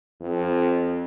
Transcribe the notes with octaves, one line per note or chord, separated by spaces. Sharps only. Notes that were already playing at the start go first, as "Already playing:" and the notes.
F2